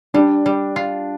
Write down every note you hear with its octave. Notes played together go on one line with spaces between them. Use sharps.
G3 D4
G3
F4